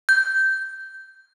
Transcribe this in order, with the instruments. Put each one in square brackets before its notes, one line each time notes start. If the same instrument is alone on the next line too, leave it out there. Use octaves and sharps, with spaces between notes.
[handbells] G6